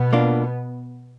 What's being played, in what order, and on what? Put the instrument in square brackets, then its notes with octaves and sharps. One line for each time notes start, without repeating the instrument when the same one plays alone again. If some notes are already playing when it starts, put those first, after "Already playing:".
Already playing: [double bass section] B2 B3
[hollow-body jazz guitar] A#3 D4 F4